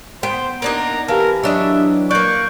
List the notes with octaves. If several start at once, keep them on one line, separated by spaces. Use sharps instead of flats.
B3 C5 G5
A#3 D4 D#4 A#5
E3 G4 A#4 F5 A5
F#3 D4 D#5 E5
A#3 D5 C#6 F#6 G6